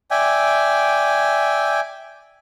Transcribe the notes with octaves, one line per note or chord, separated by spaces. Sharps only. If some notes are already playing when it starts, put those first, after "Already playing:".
D5 E5 G5 G#5